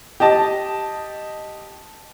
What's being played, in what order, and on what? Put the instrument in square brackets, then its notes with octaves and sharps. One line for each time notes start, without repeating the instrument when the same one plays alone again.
[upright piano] G4 D#5 A5